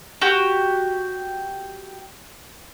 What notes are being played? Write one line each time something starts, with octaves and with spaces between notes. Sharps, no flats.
F#4 G4